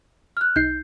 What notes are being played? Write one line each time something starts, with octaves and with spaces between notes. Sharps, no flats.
F6 F#6
B1 D#4 G6 C7